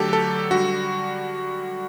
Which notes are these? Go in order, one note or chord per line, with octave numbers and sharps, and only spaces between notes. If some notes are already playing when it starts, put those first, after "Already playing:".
Already playing: D3 F#3 A3 G4 A4
A4
D3 G3 F#4